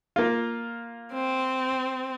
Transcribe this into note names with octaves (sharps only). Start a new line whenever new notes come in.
A#3 F4
C4